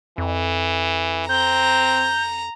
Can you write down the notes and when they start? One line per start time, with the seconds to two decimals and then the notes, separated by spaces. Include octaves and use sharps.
0.18 F2 E3
1.29 C4 A#5 G6